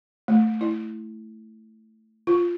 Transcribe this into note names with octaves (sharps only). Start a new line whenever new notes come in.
A3
E4
F4